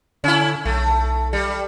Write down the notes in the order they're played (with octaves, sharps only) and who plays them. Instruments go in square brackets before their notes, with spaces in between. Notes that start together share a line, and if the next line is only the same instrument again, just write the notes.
[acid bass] D3 [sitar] C#4 E4
[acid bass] B1 [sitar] A3
[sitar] G3